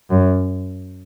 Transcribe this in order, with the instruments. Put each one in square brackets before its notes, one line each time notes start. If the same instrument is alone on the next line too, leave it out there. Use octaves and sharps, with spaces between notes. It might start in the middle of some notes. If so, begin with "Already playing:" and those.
[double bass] F#2